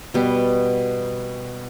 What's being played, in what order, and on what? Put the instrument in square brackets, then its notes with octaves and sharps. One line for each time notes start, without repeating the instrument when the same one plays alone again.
[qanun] B2 G3 B3